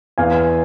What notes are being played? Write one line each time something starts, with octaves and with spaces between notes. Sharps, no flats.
E2 F5 G#5